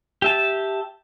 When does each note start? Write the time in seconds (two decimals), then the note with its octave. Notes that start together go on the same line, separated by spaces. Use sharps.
0.22 G4 E5 A5